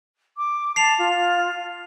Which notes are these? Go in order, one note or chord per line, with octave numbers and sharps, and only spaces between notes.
D6
A5 C7 F7
F4